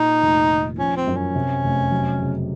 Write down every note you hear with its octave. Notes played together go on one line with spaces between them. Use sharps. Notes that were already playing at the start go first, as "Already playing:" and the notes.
Already playing: A#2 D#4
F1
D#3
F3 C#4
C4
F#2
C#4
C3
F1
F#3
C#3